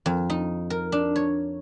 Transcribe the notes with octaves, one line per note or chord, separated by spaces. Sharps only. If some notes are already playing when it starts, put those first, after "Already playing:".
F2
D#4
A#4
D4
C#5